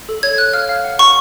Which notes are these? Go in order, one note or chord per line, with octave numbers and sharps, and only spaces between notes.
A4
C#5 G#6
C#5 F#6
F5 F6
F5
F#5
F#5 C#6